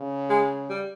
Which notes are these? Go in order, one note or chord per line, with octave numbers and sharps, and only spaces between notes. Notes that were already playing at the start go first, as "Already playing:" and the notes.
Already playing: C#3
G#3
G3